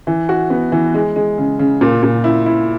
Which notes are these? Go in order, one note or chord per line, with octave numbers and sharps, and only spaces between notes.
E3
F#4
B3
E3
G#3
G#3
C#3
C#3
A#2
A#2
E4
E4